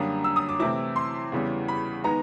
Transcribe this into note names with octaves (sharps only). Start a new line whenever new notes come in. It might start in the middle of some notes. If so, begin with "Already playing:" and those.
Already playing: F#2 D3 G3 A#3 D4 D#6
E6
D#6
D6
C3 E3 A3 C4 E4 D6
C6
E2 C#3 E3 G3
B5
D#3 G#3 B3 D#4 A#5